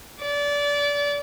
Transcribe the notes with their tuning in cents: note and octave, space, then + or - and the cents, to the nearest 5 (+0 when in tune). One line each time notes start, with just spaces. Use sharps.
D5 -25